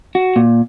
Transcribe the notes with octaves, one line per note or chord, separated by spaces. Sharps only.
F#4
A#2